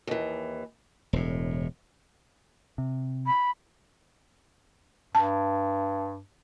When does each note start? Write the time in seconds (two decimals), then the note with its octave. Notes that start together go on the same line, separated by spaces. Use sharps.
0.07 D#2 E3
1.13 E1 A2
2.78 C3
3.26 B5
5.15 G2 A5